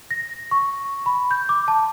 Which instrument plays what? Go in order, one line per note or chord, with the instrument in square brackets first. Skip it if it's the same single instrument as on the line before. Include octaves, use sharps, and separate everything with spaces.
[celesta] A#6
C#6
B5
G6
D6
A5